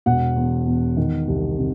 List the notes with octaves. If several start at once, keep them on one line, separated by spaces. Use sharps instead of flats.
E1 F#5
E2
E2
D#3
C2
C3